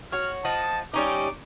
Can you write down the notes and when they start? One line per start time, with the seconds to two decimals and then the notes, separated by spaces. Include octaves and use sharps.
0.12 F#4 C#5 F6
0.45 F3 D#5 F#5 A5
0.94 G3 C#4 D#4 D6